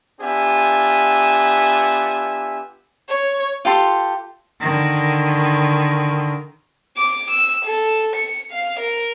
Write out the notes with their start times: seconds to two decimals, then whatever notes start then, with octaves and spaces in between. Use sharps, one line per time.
0.21 B3 D4 F4 G4 E5 G#5
3.08 C#5
3.65 F4 G4 A4 C6
4.61 D3 D#3
6.96 D6
7.30 E6
7.65 A4
8.16 C#7
8.51 F5
8.80 A#4